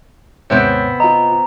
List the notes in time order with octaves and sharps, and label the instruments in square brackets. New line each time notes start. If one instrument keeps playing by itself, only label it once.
[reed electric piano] D#2 G#2 C#5 [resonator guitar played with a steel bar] C3 B3 C4
[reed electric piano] F4 D#5 [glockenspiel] A#5